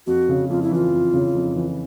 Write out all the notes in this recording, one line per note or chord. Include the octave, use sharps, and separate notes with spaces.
F2 F#4
C#3
F2 F4
E4
E3 F4
F2
C#3
F2
E3